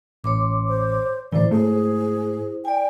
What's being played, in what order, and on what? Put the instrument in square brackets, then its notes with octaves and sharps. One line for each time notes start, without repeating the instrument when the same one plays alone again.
[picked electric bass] A1 [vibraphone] C#5 C6 D6
[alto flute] C5
[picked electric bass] A2 D3 E3 [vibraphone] E4 C5 [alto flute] D5
[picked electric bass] G#2 A3 [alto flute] G#4
[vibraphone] D5 G#5 [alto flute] G5